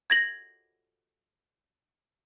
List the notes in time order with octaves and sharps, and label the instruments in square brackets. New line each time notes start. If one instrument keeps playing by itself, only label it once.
[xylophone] G#6 A#6 F#7